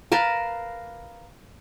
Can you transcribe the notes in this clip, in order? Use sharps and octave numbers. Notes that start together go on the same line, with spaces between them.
A#4 B4 F5 A5